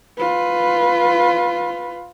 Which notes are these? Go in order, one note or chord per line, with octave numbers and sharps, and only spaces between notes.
F4 B4